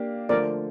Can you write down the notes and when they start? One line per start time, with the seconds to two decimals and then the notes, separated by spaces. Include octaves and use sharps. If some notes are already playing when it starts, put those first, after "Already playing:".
Already playing: A#3 D4 G4 F5
0.29 D3 F3 A3 A#4 D5